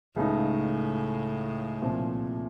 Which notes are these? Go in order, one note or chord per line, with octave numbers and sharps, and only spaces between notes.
C#2 A2 C#3 A3 D#4
C2 A#2 F3 C4